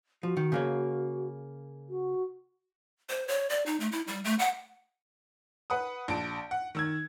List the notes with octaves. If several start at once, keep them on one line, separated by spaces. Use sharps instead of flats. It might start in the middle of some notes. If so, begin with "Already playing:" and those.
F3 F#4
D#3
C#3 A#3 C#5
F#4
C5
C#5
D5
D#4
A3
E4
G3
A3
F#5
B4 F#5 D#6
A#1 A5 D7
F#5
D#3 E6 G#6